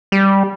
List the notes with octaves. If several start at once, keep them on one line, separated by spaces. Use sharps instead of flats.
G3